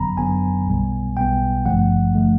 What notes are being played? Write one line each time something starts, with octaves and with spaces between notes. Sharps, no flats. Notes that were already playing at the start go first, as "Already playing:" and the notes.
Already playing: G1 F#2 D3 F#3 B3 A#5 B5
G1 F#2 D3 F#3 B3 G#5
B1 B2 G3 B3
B1 B2 G3 B3 G5
G#1 G2 D3 F3 A3 F#5
D3 F3 A3